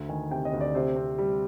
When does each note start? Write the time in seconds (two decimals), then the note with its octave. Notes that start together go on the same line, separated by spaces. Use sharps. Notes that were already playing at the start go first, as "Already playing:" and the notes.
Already playing: D2
0.09 D#3 G#5
0.31 C3 G5
0.45 D#5
0.53 D2
0.61 D5
0.75 C3 C5
0.96 C4
1.18 G3